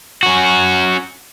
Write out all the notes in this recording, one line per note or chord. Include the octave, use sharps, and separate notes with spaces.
C#4 F#4